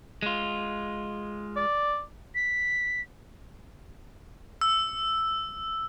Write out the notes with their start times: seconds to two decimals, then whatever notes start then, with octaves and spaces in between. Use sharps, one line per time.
0.22 G#3 F4
1.57 D5
2.35 B6
4.61 E6